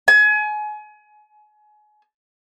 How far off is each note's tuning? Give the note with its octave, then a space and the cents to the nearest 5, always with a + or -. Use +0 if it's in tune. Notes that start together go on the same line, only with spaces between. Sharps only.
G#5 +30